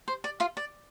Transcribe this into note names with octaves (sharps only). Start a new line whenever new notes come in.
C5
D5
F4 F5
D5